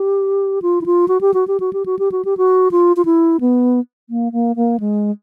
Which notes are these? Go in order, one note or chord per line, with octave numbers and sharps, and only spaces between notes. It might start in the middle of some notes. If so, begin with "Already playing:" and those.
Already playing: G4
F4
E4
F4
F#4
G4
F#4
G4
F#4
G4
F#4
G4
F#4
G4
F#4
F4
F4
E4
B3
A#3
A#3
A#3
G#3